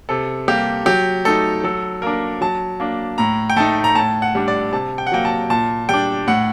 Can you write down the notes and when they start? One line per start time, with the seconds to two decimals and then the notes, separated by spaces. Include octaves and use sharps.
0.09 C3 A4
0.48 G3 A#3 G4
0.86 F#3 G4
1.25 A3 D#4 A4
1.64 F#3 A4
2.02 A#3 D4 A#4
2.41 F#3 A5
2.80 A#3 D4
3.18 A2 A#5
3.50 G5
3.56 A3 D#4 A5
3.84 A#5
3.95 A2 A5
4.22 F#5
4.35 G3 D4
4.48 D5
4.72 C3 A5
4.98 G5
5.07 F#5
5.12 F#3 A#3 G5
5.25 A5
5.50 A#2 A5
5.89 G3 D4 G5
6.27 A2 F#5